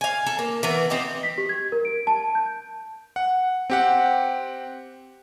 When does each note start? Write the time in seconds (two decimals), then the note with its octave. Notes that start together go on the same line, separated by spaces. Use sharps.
0.01 F5 G#5
0.26 A4
0.39 A#3
0.63 E3 B3 A#4
0.90 C4 D#4 G4
1.23 B6
1.38 G4
1.49 G#6
1.72 A#4
1.85 D7
2.07 A5
2.35 G6
3.16 F#5
3.70 C4 G4 F#5